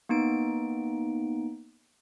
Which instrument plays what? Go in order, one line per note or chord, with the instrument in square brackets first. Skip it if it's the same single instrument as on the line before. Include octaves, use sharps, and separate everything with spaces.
[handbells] A#3 B3 D#4 D7